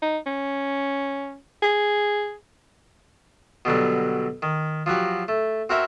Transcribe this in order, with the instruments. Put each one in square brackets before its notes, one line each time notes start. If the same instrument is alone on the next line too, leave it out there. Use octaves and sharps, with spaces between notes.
[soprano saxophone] D#4
C#4
G#4
[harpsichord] B2 D3 F#3 G3
D#3
F3 F#3 F#4 G4
A3
C4 F#4 A#4 C5 C#5 E5